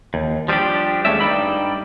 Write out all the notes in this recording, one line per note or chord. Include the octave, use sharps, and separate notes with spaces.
D#2
F3 G3 B3 D4 G4
D#2 G#3 A3 C#4 D5 E5
G2 G3 D#4 D5 G5 B5